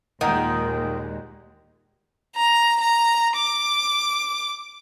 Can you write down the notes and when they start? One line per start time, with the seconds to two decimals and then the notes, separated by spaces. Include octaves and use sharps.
0.21 D#2 A#2 D#3 G#3 F#5 A#5 G6
2.36 A#5
2.80 A#5
3.37 D6